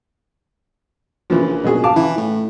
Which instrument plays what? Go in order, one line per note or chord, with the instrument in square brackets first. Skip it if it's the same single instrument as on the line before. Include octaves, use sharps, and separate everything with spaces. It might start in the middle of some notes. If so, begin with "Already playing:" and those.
[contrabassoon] A#1 [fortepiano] C#3 E3 F3
[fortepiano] B2 F#3 G#4
F5 A5 D6
[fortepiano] C#3 [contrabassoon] E3
[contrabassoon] A2